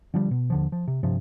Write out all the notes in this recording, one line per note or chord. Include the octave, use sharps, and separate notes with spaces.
D3 F3 G3
B2
D#2 D3 F3
F3
C3
G2 C3 F3